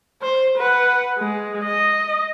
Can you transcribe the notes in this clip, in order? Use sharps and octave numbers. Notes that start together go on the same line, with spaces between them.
C5
B4 F#5
G#3
D#5